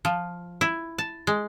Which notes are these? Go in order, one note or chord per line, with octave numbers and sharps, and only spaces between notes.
F3
E4
A5
G#3